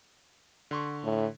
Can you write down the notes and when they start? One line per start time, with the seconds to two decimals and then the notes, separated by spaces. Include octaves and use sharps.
0.71 D3 C6 C#6
1.04 A2